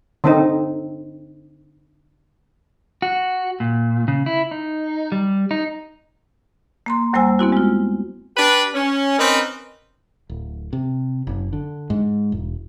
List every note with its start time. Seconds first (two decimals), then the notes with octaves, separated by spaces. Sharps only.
0.24 D3 C4 D#4
3.02 F#4
3.60 A#2
4.08 C#3
4.26 E4
4.51 D#4
5.12 G3
5.51 D#4
6.86 A#3 A#5 C6
7.13 D#2 G3 A#3 C5 G#5 E6
7.39 B3 C4 E4 F#4
7.52 G#3 F4
8.37 D4 G4 B4
8.74 C#4
9.18 C4 C#4 D#4 A#4 B4
10.30 D1
10.73 C3
11.27 F#1
11.53 D3
11.90 G#2
12.32 E1